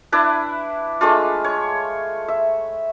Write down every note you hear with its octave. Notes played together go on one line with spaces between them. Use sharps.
D4 E4 B4
G#3 A3 D4 F4
C#5
E5